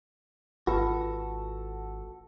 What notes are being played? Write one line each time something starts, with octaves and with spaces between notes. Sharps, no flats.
G#1 F4 F#4 A4 B4